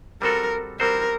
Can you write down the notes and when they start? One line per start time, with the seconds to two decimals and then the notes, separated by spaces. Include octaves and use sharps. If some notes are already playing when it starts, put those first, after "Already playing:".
0.22 G3 C4 F#4 A4 A#4
0.80 G3 C4 F#4 A#4 C5